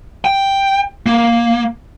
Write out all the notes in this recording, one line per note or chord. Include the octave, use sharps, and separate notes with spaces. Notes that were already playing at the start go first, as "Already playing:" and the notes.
G5
A#3